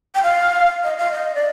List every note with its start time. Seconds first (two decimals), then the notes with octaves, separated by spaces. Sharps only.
0.15 G5
0.23 F5
0.84 D#5
0.97 F5
1.12 D#5
1.35 D5